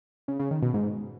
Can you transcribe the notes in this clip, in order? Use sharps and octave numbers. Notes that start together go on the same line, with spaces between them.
C#3
C#3
D#3
B2
G#2